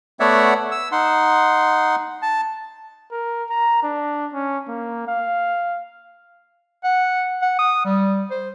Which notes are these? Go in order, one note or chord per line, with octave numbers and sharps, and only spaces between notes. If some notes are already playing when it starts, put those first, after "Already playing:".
A3 B3 C#5 D5 E5 F#5
E6
D#4 F#5 C6
A5
A#4
A#5
D4
C#4
A#3
F5
F#5
F#5
D#6
G3
C5